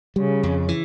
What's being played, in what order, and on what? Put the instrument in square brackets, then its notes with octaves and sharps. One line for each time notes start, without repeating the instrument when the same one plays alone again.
[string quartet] C#3 [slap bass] G3
[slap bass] F2
E3